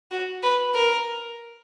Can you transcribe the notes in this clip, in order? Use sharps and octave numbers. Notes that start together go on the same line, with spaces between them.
F#4
B4
A#4